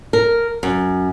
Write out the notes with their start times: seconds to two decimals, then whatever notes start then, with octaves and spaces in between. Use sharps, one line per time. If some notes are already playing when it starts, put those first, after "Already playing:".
0.13 A#4
0.63 F#2